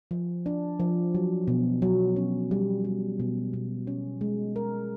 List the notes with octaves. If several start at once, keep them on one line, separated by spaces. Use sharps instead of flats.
F3
D4
F3
F#3
B2
F#3
C#4
G3
G3
B2
B2
C#4
G#3
A#4